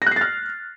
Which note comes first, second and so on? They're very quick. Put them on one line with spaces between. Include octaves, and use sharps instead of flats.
A#6 F#6 C7 A6 F6